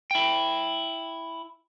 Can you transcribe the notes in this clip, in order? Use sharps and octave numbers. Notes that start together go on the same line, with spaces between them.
E4 G5